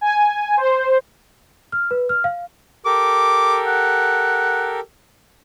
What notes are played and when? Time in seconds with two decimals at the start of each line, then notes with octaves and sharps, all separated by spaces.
0.01 G#5
0.57 C5
1.72 F6
1.91 B4
2.09 F6
2.24 F5
2.86 G4 A4 A#4 D6
3.67 F#5